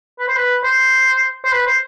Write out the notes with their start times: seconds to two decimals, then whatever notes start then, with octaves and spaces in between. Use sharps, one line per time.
0.19 B4
0.28 C5
0.36 B4
0.64 C5
1.44 C5
1.53 B4
1.67 C5